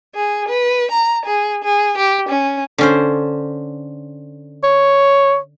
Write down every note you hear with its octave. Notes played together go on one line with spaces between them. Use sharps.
G#4
B4
A#5
G#4
G#4
G4
C#4
D3 C#4 C5
C#5